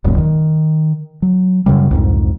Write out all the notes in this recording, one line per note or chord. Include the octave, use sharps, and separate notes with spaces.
D#1 C#2 F#2 A#2
D#3
F#3
F#2 A#2 C#3 G3
C2 F2 G#2